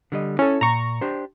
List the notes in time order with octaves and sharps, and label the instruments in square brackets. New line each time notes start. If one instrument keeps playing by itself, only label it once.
[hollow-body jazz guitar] D3 G3 D#5
[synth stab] C#4 [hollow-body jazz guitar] E4 A4
[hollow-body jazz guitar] A#2 [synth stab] A#5 C#6
[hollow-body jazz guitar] D4 G4 C5